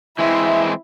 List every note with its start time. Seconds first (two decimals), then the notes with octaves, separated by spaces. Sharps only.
0.19 E3 G#3 C4 E4 E5